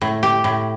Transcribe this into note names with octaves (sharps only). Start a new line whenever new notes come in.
A2
G4
A2